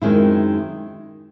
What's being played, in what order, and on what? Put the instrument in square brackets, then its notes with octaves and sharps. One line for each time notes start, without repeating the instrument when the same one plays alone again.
[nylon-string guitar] F#2 D#3 G#3 C4 E4